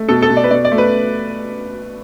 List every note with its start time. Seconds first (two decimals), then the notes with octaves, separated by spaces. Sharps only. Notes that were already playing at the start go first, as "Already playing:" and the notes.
Already playing: A3
0.09 B2 A4
0.22 A4
0.30 B2
0.37 D5
0.44 B4
0.51 B2 D5
0.65 D5
0.72 A3
0.78 B4